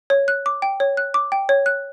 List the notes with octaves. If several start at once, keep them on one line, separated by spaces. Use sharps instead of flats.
C#5
F#6
D6
G5
C#5
F#6
D6
G5
C#5
F#6